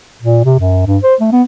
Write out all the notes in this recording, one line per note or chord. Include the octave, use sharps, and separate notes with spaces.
A#2
C3
F#2
G2
C5
A3
B3